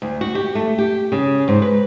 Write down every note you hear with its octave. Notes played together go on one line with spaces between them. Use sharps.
D2
F#4
G4
A3
G4
C#3
G#2
B4